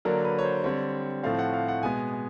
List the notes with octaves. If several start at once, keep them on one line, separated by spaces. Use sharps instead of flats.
D3 F#3 A#3 D4 A#4
B4
C#5
C5
D3 G3 C4 C#5
A2 F3 A3 C4 F5
F#5
F5
F#5
B2 G#3 B3 G#5
G#5